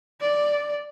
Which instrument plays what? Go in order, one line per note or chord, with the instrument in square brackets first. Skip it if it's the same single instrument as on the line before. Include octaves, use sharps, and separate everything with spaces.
[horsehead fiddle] D5